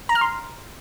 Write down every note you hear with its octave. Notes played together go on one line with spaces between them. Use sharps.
A#5
F6
C6